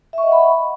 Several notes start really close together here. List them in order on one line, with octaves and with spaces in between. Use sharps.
E5 C#6 D#5 F#5 B5